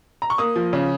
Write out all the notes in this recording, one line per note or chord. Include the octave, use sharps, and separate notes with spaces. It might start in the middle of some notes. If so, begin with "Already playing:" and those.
A#5
C#6
A#3 D#6
F3
C#3